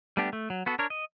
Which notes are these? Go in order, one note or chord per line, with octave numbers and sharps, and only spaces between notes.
G3 A3 B3 D4 G4
A3
F#3
B3 F#4 A4
D4 A#4 C#5
D#5